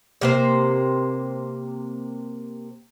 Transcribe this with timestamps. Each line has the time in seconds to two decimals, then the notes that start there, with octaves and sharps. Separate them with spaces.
0.21 C3 A#3 C5